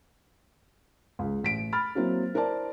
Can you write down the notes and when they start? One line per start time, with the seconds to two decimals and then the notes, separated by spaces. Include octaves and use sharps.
1.19 C#2
1.43 A1 B6 D7
1.73 B5 F6 A6
1.95 F#3 A#3 C4 E4
2.34 E4 A#4 C5 D5 A5